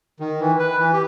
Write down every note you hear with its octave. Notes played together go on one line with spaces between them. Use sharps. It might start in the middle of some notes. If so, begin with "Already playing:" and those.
D#3
E3
B4
E3
G4